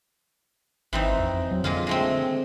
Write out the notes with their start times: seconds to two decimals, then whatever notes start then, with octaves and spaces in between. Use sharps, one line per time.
0.93 G#1 E3 C4 D#4
1.19 F2
1.51 F#3
1.64 A#2 D3 G#3 F4
1.87 G#3 A3 C4